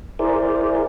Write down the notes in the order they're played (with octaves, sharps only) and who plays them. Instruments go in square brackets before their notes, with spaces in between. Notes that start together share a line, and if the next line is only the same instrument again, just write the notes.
[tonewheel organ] E4 G#4 A#4 C5 D5